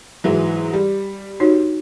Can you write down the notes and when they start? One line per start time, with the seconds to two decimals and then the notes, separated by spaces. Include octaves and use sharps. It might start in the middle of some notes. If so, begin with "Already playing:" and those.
0.24 G#2 E3 F#3
0.73 G3
1.40 D#4 F#4 C#5